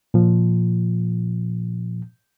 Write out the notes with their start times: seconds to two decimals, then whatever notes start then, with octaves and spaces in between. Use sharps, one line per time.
0.14 A#2 F3